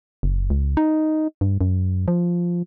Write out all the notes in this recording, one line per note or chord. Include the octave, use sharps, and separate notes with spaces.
F#1
C#2
D#4
G2
F#2
F3